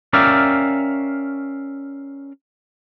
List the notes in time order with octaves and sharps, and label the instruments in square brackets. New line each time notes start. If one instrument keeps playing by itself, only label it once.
[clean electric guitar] C#4 A#4 D5 E5 F5 G5